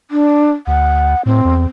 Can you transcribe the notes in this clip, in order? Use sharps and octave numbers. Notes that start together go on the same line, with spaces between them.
D4
D2 F#5
A2 C4
E2